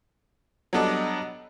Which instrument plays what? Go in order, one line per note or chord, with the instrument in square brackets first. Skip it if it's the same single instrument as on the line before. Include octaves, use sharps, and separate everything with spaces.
[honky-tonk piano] F#3 G3 B3 D4 A4 D#5